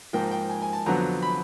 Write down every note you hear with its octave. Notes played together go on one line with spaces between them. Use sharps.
G#2 F3 A#3 G5
G5
G#5
G#5
A5
F2 D3 F#3 B3 A#5
B5